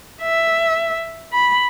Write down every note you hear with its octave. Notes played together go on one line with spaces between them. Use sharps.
E5
B5